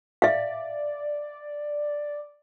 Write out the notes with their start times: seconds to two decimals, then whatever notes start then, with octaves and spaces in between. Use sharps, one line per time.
0.22 D5 E5 F5